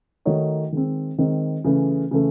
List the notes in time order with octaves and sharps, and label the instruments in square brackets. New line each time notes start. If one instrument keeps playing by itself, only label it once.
[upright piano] D#3 A3 D#4 F#4 C#5
D#3 G#3 C4
D#3 G#3 C4
C#3 E3 A3
C#3 E3 A3